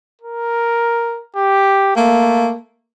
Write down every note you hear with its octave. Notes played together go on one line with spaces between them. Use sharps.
A#4
G4
A3 A#3